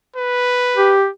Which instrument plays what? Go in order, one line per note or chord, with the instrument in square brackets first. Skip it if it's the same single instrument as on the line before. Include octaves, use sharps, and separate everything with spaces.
[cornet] B4
[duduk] G4